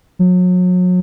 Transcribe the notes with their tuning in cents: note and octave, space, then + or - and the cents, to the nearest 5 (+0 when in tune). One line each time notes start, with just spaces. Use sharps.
F#3 -35